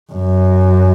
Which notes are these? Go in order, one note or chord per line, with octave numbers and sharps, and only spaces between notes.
F#2